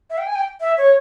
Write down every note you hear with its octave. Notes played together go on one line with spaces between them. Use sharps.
E5
G5
G#5
G5
E5
C#5